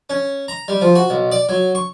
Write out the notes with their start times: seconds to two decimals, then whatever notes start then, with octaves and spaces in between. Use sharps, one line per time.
0.10 C#4
0.48 A#5
0.68 G3
0.82 F3
0.95 F#4
1.10 B1
1.32 D5
1.49 F#3
1.75 C#6